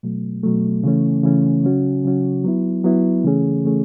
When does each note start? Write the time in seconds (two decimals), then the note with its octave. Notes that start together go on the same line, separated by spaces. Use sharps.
0.03 B2 F#3 A3
0.43 B2 F#3 A3
0.83 C#3 E3 A3 C#4
1.23 C#3 E3 A3 C#4
1.64 C#3 F#3 C#4 F#4
2.04 C#3 F#3 C#4 F#4
2.44 F#3 B3 E4
2.84 F#3 B3 E4
3.24 C#3 E3 A3 C#4 G#4
3.64 C#3 E3 A3 C#4 G#4